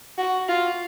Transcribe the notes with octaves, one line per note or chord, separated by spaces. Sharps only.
F#4
F4